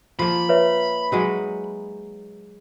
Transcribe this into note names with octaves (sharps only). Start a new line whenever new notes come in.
F3 A#3 B5
B4 C#5 E5
F#3 G#3 D#4